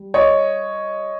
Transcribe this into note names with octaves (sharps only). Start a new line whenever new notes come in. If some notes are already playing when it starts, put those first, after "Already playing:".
Already playing: G3
C#5 D#5